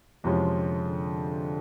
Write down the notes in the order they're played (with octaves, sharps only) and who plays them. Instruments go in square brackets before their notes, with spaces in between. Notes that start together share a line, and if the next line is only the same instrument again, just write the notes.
[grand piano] F2 C3 F3 G#3 C#4 [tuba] E3
[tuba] D3
D3